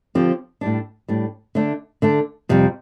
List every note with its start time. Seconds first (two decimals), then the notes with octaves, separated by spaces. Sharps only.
0.15 D3 F3 C4 G4
0.61 A2 G3 D4
1.08 A2 G3 D4
1.55 D3 A3 D4
2.02 D3 A3 D4
2.49 F2 C3 G3